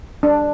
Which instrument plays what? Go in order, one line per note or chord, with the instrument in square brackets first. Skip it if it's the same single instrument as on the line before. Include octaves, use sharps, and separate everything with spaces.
[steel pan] D4